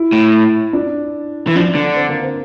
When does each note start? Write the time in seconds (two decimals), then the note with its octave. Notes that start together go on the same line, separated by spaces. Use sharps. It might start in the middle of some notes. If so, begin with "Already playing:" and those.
Already playing: E4
0.13 A2
0.73 D4
1.47 E3
1.56 F3 D4
1.75 D3
1.96 C4
2.09 A#3
2.23 C4